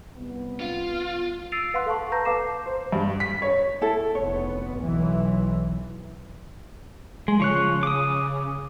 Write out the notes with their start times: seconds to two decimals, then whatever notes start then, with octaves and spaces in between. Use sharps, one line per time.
0.16 C2 B3
0.61 F4
1.52 E6 A6 C7 D7 D#7 F7
1.74 B4 F5 F#5 C6 F#6
1.86 A4 F5 A5 C#6
2.12 A4 B4 A5 A#5 G6 A#6
2.25 B4 F5 A5 D6 C7 E7
2.66 C5
2.92 G2
3.20 B6
3.42 C#5
3.81 E4 A4
4.15 F1 B3 C#5
4.79 B1 E3
7.28 G#3
7.40 C#3 F3 C#5 F#6
7.83 D6 D#6